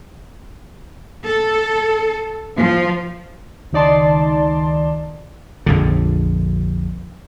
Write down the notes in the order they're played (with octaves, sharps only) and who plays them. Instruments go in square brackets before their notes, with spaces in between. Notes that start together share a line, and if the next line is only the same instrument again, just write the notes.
[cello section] A4
F3
[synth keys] C#2 D#3 D#4 D5 A5 C6
[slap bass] A#1 F2 D3